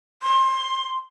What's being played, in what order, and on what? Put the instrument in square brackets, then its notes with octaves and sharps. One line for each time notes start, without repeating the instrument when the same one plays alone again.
[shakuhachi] C6